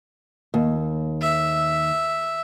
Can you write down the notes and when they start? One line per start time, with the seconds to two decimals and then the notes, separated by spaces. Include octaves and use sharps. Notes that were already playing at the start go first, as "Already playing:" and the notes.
0.54 D#2
1.21 E5